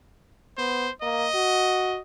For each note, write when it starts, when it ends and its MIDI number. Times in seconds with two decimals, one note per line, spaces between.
0.58 0.88 59
0.58 0.91 72
1.02 1.27 58
1.02 2.02 75
1.35 1.99 66